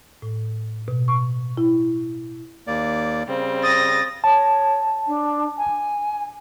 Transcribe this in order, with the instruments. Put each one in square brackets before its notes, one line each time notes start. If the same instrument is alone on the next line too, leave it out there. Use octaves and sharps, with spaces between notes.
[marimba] A2
B2
C#6
E4
[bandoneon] D#2 A#3 D5
[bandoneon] C#3 G3 [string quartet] C4
[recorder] D#6 [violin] A6 A#6
[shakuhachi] C#5 [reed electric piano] A5
[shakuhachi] D4
G#5